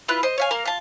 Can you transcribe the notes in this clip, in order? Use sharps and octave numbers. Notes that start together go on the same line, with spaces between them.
E4 F4 B4 F#6
C5 D#5
C#5 F5 G#5
A#3 A#4 F5
F4 A5